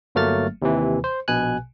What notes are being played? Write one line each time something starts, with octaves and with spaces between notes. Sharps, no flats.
G1 F#3 A3 A#3 F6 A6
D#2 C3 E3
C5
A#1 B2 G#5 F#6